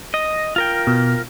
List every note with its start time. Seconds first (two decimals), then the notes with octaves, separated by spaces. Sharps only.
0.14 D#5 A#6
0.56 F4 A#4 G5
0.87 B2